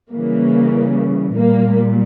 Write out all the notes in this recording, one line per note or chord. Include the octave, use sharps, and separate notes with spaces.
C#3 E3 G3 A#3
A#2 G3 A#3